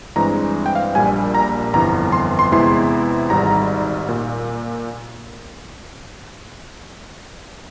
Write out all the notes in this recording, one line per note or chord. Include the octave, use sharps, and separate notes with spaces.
G2 E3 G#3 C4 A#5
G5
F5
A#1 A#2 G3 G#5
A#5
G1 F2 E3 A#5
C6
C6
E2 C3 E3 G#3 E4 C6
G#1 G#2 G3 A#5
A#2